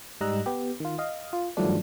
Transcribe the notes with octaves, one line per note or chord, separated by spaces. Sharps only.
G#2 G3 D#5 A#5 E6 F#6
B3 G4
D#3 F4
D#5 F5
F4
G2 D#3 F3 F#3 A3 D4